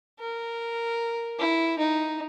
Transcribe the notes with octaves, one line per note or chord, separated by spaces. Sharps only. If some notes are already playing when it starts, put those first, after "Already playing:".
A#4
E4
D#4